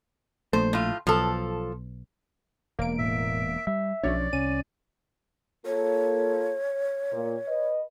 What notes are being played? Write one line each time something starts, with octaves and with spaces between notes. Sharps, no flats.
A#1 A3 C5
A2 F4
B1 F3 A4
E1 A#3 D7
A2 E5
G3 E5
B1 F3 C#4 D4 C#5 D5
C2 C#4 D#7
A#3 F4 A4 C#5
A#2
B4 D#5